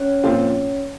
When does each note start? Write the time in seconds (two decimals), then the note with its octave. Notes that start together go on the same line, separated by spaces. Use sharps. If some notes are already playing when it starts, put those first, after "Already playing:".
Already playing: C#4 C#5
0.23 A#2 F3 C4 F4